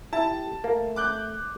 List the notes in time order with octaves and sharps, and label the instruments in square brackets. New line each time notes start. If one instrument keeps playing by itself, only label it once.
[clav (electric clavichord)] E4 [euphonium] G4 [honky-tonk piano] A5
[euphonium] A3 [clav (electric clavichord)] A#3
[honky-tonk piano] D6 F#6 G6